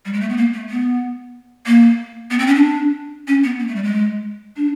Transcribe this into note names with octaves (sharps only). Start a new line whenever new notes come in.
G3
G#3
A3
B3
A#3
A3
B3
A#3
B3
C4
C#4
D4
C#4
B3
A#3
A3
G3
G#3
D4